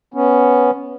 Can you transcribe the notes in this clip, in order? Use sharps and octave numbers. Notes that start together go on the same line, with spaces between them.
B3 C#4